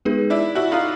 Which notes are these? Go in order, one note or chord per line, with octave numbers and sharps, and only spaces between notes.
G#3 B3 D#4 G#4 B4
D4 E4
E4 F#4
D#4 F4